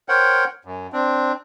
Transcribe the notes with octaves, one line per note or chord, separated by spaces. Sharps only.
A#4 C5 C#5 F#5 G5
F#2
C4 D4